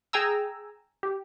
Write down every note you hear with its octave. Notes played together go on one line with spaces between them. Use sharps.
G#4 G5 G#5 A#5 E6
G4